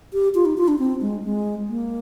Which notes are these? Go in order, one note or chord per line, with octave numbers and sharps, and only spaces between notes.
G4
F4
D#4
F4
D4
C4
G#3
G#3
A#3